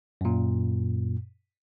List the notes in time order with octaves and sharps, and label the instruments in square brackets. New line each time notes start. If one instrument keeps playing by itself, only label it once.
[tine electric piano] F#2 A#2